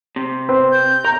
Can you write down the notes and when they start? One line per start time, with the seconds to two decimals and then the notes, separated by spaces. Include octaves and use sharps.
0.16 C3
0.49 C4 B4
0.72 G6
1.05 A#4 A#5